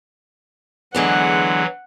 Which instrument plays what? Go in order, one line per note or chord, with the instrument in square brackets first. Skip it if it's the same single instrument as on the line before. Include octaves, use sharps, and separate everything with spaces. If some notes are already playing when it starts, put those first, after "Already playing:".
[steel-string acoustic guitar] E2 D3 G#3 [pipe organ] E3 F#3 [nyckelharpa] F#5